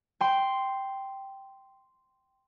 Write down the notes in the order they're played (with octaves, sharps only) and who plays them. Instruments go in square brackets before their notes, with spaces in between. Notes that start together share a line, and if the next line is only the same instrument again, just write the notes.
[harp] G5 C6